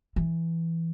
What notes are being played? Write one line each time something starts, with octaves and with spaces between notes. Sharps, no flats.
E3